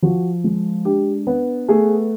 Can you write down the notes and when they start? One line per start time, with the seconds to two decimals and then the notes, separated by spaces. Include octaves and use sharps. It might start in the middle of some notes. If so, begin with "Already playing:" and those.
0.03 F3 F#4
0.44 G#3
0.85 D4 G4
1.27 B3
1.68 A3 G#4